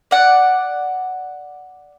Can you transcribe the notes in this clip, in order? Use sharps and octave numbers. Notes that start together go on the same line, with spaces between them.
D5 F#5